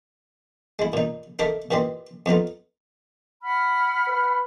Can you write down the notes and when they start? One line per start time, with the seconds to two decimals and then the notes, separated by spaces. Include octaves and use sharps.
0.79 G#3 E4
0.93 A#2 D#4
1.39 D#4 A4 A#4 E5 D6
1.71 A#2 E3 G4 D#5 C6
2.26 F2 B3 D#4 F4
3.43 F#5 B5 F6
4.07 B4